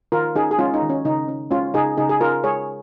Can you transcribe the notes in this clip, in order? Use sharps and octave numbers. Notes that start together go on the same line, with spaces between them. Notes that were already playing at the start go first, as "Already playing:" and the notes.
D#3 F4 A#4
C#4 D#4 G#4
G#4
G#3 C#4 F4
D#4
D#3
C#4
C#3 D#4
C#4
G#3 C#4 F4
C#3 D#4 G#4
C#3 D#4 G#4
G#4
C#4 F4 A#4
G#3 G#4 C#5